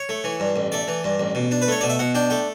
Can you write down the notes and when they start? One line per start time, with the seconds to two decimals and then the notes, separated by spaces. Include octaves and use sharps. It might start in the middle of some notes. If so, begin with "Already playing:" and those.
Already playing: C#5
0.09 A3
0.24 E3
0.40 G2
0.56 A1
0.72 A3 D5
0.88 E3
1.04 G2
1.20 A1
1.35 B2
1.51 D4
1.62 B4
1.68 A3 C#5
1.81 B2 D5
1.89 E5
1.99 B2 F#5
2.15 D4 G5
2.30 A3 G5